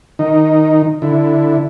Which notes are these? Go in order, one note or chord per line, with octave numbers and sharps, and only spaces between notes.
D#3 D#4
D3 E4